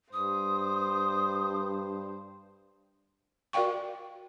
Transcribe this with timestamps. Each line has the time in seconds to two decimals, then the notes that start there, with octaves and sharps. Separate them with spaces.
0.13 G2 C5 D#6
3.53 F#4 A#4 D5 F5 G5 C#6